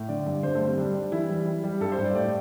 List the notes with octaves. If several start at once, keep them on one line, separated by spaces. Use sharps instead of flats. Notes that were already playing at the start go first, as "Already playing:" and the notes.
Already playing: A2
D3 D5
G2
D3 C5
A3
G3
C4
G3 D4
G3
E3 E4
G3
G3
G3
G2 A4
C5
G2
D5
A2 D5